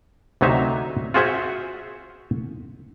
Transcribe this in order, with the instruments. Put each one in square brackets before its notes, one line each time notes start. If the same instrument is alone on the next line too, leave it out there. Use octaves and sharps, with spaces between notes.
[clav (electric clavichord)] D2 C3 F#3 D#4 E5
F4 F#4 G#4 C5 E5 F#5